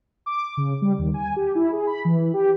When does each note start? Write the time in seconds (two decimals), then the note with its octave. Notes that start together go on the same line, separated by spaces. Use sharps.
0.26 D6
0.57 C#3
0.82 G3
0.98 D#2
1.14 G#5
1.36 G4
1.55 E4
1.72 G#4
1.87 B5
2.05 E3
2.34 G4